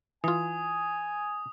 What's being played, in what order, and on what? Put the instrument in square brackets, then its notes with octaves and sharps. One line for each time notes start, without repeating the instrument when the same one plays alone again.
[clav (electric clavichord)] E3 F4 [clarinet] G#5 [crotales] D#6